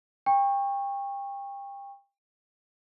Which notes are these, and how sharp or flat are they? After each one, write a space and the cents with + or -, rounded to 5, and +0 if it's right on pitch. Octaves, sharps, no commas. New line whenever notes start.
G5 +30 C#6 -10